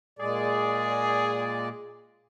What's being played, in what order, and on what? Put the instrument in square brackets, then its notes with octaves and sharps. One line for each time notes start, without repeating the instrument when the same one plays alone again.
[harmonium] A#2 G#3 D5 [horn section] G#4